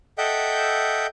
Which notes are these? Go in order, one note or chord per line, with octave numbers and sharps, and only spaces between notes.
A4 D#5 E5 F#5 G5 G6